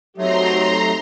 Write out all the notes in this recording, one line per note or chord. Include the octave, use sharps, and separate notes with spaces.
F#3 A3 C4 D#4 G4 A#5 C6